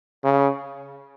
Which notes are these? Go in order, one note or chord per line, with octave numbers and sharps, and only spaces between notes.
C#3